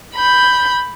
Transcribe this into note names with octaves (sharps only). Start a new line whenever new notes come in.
B5 G6